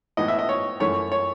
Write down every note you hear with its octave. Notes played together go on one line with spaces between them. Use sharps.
A2 E3 B3 D#5
E5
D#5
C#5
F#2 E3 A3 C#4 C#5
C#5